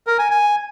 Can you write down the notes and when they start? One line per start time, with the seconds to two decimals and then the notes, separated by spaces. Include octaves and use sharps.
0.07 A#4
0.19 G#5
0.31 G#5